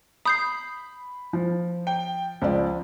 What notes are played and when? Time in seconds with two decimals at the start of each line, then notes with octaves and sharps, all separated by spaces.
0.25 B5 D#6 G6 C7
1.33 F3
1.87 G5
2.42 C#2 F3 D5